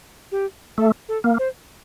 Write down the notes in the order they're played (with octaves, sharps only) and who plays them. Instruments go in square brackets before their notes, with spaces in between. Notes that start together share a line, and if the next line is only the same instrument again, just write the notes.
[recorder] G4
[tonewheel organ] A3 [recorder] A4
[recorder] A4
[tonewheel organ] A#3
[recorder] C5